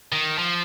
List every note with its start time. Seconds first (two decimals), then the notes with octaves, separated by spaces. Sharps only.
0.12 D#3
0.38 F3